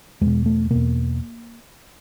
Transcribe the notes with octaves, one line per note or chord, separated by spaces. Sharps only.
E2 B2 G#3
A3
E2 B2 A#3